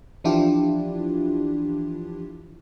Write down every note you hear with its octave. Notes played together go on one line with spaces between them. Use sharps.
E3 F3 D4 E4 F4 G4